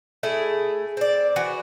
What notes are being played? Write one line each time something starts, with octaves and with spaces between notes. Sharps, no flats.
A3 E4 G#4
C4 D5
E3 F#4